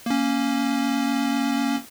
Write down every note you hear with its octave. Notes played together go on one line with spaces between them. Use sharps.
A#3 C#4